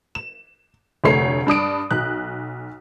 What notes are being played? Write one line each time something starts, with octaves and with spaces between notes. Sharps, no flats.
E7
F1 D2 A3 C#5 C7
G2 D4 D#6 D7
B1 F#6